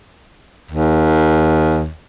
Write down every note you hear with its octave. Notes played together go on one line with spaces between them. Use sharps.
D#2